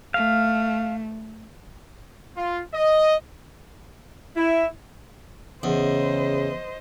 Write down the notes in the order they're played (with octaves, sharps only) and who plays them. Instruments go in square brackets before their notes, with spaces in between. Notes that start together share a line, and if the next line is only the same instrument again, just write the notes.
[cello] A3 [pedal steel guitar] F5
[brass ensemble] F4
D#5
[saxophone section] E4
[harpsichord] E2 [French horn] C#3 [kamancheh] C5 D#5